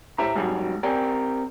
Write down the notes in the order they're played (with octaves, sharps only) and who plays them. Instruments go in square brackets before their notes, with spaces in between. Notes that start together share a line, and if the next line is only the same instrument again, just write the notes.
[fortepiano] A2 G4 E5 [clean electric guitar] C5 A#5
[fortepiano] G#1 G3 [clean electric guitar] G#2 F#3
[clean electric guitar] C4 G4 A#4 [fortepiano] D5 G5 G#5